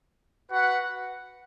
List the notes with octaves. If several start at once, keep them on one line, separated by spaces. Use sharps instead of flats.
F#4 B4 F#5